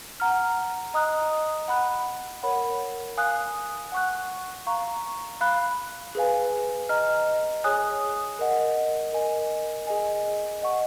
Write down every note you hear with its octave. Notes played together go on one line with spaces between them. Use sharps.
F#5 A#5 F6
D#5 A#5 D#6 F#6
F#5 B5 F#6
A#4 C#5 F#5 B5
F5 G#5 D#6 F#6
F#5 C#6 F#6
F5 A#5 C#6
F5 B5 F#6
G#4 B4 F5 G#5
D#5 A#5 F6
G#4 C#5 G#5 D#6 F#6
A#4 D#5 F#5
A#4 D#5 G#5
G#4 D#5 G#5
D#5 F#5 C#6